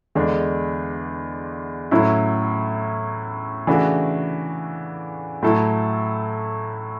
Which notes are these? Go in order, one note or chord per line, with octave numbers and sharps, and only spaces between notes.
E2 D3 G#3 D4
A2 F#3 C#4 E4
C#3 E3 A3 D4 F#4
A2 F#3 A3 E4 A4